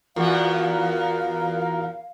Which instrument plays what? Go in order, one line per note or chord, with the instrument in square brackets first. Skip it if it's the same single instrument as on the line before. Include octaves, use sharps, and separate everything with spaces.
[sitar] E2 B3 [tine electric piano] F4 F#4 [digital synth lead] A#4 [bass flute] F5